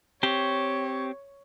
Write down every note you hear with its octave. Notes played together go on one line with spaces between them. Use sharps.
C4 G4 C#5